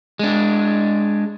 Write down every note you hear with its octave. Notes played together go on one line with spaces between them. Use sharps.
G#3 D4